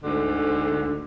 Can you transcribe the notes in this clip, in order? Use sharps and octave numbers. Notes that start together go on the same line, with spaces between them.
D2 G#2 D3